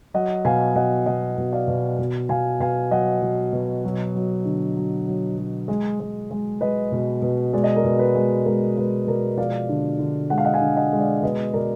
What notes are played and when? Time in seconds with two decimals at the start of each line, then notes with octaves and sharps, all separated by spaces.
0.14 F#3 D#5 F#5
0.45 B2 F5 G#5
0.75 B2 D#5 F#5
1.06 B2 D#5 F#5
1.38 B2
1.53 D5 F5
1.68 B2
1.98 B2
2.29 B2 F5 G#5
2.60 B2 F5 G#5
2.91 F#3 D#5 F#5
3.22 B2
3.53 B2
3.84 F#3
4.15 F#3
4.45 D3
4.77 F#3
5.08 F#3
5.38 F#3
5.68 G#3
6.00 G#3
6.31 G#3
6.61 G#3 B4 D#5
6.92 B2
7.22 B2
7.53 G#3 D5
7.64 D#5
7.75 A#4 D5
7.84 B2
7.99 B4
8.15 G#3
8.46 G#3 A#4
8.77 G#3 B4
9.07 B2 A#4 D5
9.38 F3 D5 F5
9.69 D3
9.99 D3
10.30 G#3 F#5
10.38 F5
10.45 D#5 F#5
10.54 F5 G#5
10.61 D3
10.77 D#5 F#5
10.93 G#3
10.99 D5 F5
11.22 B2 B4 D#5
11.54 B2 A#4 D5